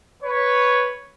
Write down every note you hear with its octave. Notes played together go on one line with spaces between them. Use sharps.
B4 C#5